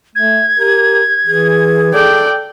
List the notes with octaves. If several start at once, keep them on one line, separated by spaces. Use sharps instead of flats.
A3 G#6
G4 A#4
E3 G#4
A4 D5 G5